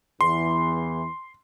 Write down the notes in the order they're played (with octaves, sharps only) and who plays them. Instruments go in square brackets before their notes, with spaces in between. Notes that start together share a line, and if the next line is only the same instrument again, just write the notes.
[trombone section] E2 E3 [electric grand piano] C6